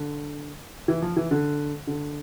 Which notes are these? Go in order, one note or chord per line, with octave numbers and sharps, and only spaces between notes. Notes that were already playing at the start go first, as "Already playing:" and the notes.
Already playing: D3
E3
F3
E3
D3
D3